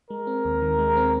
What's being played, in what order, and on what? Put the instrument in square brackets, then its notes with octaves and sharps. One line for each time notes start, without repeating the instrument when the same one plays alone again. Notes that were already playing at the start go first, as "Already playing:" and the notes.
[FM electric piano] G#3 [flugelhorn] A#4
[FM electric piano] C4
D#2
D#3
G#3
C4